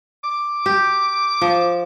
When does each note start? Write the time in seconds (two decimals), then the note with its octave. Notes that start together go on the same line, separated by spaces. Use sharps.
0.24 D6
0.66 G4
1.41 F3